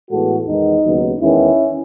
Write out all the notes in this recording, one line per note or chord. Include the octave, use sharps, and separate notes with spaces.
A2 E3 G#3 B3 F#4 A4
E2 D#3 G#3 B3 D#4
D#2 C#3 F#3 B3
E2 D#3 G#3 B3 C#4 E4